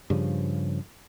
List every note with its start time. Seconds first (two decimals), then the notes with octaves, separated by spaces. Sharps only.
0.10 G2 C#3 F3